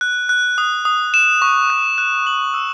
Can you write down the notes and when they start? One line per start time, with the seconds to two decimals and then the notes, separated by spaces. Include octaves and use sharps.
0.01 F#6
0.29 F#6
0.58 D#6
0.85 D#6
1.14 E7
1.42 C#6
1.70 F#6
1.98 F#6
2.27 F#7
2.54 E6